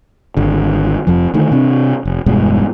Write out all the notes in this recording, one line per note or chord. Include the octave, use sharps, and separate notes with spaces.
G#1 D3
F1 F2 F3
D3 D#3 A3
C3 C4 D4
F1
E1 G2 B2 G#3